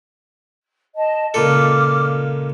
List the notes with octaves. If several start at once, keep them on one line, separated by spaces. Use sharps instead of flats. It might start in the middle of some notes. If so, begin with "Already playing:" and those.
D#5 A5
C#2 A#2 A4 D6 F6